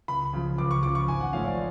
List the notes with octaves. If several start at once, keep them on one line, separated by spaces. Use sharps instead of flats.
C#2 B5
C#3 F3
C#2 D6
C#6
C#3 F3 D6
C#6
G#1 G#5
F#5
G#2 F3 A3 C#4 F5
D5